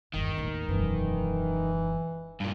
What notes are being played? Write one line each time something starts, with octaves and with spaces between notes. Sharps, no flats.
G1 E2 D#3
D#2 A2
E1 F#2 E3
G2 A#2